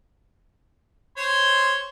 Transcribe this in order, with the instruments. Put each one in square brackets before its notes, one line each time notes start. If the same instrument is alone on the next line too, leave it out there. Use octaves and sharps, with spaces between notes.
[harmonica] C5 C#5 C6